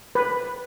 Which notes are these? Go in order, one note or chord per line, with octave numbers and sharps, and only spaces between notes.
B4